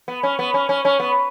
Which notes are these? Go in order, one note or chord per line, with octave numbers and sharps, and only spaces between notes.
B3
C#4
B3
C#4
C#4
C#4
B3